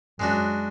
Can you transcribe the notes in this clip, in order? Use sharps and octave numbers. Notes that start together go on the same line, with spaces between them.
F#2 G#3 D4 F#4